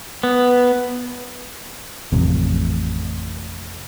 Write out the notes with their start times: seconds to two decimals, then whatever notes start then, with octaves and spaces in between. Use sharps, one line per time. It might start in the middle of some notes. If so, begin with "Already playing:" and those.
0.23 B3
2.12 A1 F2 C3